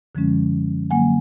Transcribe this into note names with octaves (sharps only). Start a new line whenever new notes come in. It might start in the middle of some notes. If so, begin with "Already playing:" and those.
F#2 D3 F3 G#3 C#4
D3 F#3 A#3 F#5 G#5